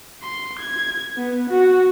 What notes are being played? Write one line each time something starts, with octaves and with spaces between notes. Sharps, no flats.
C6
G#6
B3
F#4